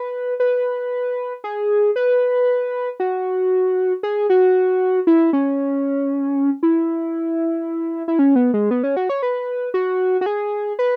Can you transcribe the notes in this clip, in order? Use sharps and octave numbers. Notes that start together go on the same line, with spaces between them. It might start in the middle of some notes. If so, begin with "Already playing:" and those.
Already playing: B4
B4
G#4
B4
F#4
G#4
F#4
E4
C#4
E4
E4
C#4
B3
G#3
B3
C#4
F#4
C#5
B4
F#4
F#4
G#4
B4